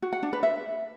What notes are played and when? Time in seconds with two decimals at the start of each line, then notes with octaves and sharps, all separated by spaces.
0.02 F#4
0.13 F#5
0.23 D4
0.33 B4
0.43 E5